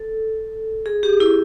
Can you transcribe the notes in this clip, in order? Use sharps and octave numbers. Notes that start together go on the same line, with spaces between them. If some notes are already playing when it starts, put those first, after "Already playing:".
Already playing: A4
G#4
G4
E4